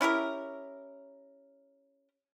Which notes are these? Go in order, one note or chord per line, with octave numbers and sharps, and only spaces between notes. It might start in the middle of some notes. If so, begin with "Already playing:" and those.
C#4 E4 G4 A#4